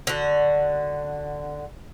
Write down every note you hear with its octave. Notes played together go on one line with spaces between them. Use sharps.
D3 F#4